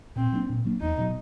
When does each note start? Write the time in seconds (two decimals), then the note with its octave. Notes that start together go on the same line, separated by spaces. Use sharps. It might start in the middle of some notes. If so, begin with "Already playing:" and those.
0.16 A#2 C4
0.32 F#3 A#3 D4
0.49 A#2
0.65 F#3 A#3 D4
0.81 E2 D#4
0.98 B2 F#3